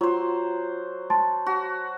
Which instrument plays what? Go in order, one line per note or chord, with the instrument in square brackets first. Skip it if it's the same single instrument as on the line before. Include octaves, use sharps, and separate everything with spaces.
[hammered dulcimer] F#3 C5 [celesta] F4
[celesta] A5 C6 A6
[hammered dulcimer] F#4